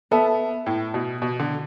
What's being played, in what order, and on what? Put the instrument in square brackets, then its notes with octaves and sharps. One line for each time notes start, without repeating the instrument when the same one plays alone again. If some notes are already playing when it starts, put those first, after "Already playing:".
[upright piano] B3 [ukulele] A4 E5 A5
[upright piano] A2
B2
B2
D3